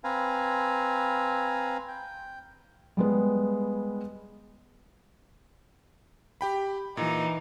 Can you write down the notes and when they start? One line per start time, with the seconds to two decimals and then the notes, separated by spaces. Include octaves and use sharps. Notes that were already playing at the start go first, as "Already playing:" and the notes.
0.04 C4 B4 F5 G#5 A#5
1.88 G5
2.97 G3 G#3 B3
6.41 G4 G5 B5
6.97 A#2 E3 D#4